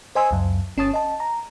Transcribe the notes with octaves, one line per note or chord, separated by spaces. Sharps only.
C5 D#5 G#5 C6 E6
C#2 F#2
G1 C#4 C#5 A5 D#6 A6
D#5 A5
A#5